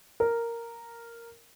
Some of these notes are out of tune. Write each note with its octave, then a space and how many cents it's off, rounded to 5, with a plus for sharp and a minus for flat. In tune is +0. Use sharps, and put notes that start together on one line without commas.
A#4 -5